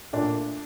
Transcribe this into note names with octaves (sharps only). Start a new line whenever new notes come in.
A#2 A3 D4